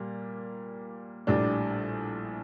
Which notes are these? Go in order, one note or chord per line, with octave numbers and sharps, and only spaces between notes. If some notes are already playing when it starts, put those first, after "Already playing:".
Already playing: A#2 G3 A#3
A#1 A2 G3 D4